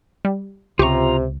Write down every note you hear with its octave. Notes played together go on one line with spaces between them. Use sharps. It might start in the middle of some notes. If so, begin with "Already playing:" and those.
G3
C#2 C3 F4 G4 A#5 C#6